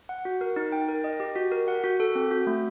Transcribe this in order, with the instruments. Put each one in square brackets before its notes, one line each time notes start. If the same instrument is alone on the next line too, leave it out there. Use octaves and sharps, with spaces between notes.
[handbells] F#5
F#4
A#4
D#4
G5
A#4
D#5
G4
F#4
A#4
F#5
F#4
A4
C4
F#4
A3